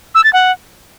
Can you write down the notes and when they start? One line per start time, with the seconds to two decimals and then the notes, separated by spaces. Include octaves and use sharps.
0.15 E6
0.24 A6
0.33 F#5